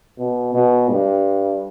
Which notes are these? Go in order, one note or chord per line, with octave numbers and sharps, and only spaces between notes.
B2
B2
G2